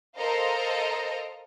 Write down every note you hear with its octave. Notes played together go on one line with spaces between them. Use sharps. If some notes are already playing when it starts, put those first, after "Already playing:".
A4 A#4 C5 D#5 F5 A#5